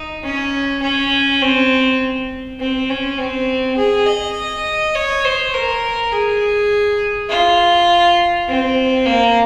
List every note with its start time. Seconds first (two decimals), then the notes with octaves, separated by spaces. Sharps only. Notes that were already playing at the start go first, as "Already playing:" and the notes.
Already playing: D#4
0.24 C#4
0.83 C#4
1.42 C4
2.60 C4
2.90 C#4
3.18 C4
3.77 G#4
4.06 D#5
4.95 C#5
5.24 C5
5.54 A#4
6.12 G#4
7.30 F4
8.48 C4
9.06 A#3